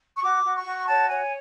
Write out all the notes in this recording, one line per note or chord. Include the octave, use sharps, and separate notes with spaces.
C#6
F#4 D6
F#4
C#6
F#4
C#5 A5
C#5 G#5